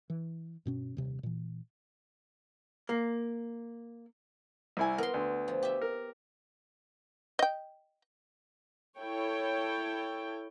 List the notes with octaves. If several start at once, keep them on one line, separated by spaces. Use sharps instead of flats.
E3
G2 B2 C#4
D#1 C3
A#2 E3
A#3
C2 E4 G#5
B3 A#4 C6
D2
F3
G4 E5
A#4
D#5 G5
E4 A4 C#5 G5